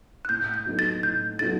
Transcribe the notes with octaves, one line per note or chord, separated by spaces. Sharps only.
F#6
A2 G6
G6
F#3 B3 D#4 A4
A6
A2 G6
F#3 B3 D#4 A4 A6